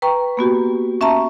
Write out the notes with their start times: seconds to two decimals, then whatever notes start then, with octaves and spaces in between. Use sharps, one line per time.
0.02 B4 G5 A#5 C#6
0.37 A#3 B3 F#4 G4
1.01 C#4 E5 A5 A#5 C#6